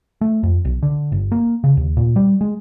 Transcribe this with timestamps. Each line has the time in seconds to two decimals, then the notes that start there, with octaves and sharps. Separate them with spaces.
0.21 A3
0.43 F2
0.65 B1
0.83 D3
1.12 G1
1.32 A#3
1.64 C#3
1.77 D#2
1.97 A#2
2.16 G3
2.41 G#3